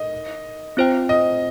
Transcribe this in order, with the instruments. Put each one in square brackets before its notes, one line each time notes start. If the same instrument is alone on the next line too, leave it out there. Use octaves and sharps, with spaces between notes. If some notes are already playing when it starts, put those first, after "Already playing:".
Already playing: [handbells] D#4 A#4 [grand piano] D#5
[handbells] C4 F4 C5 G5
[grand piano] D#5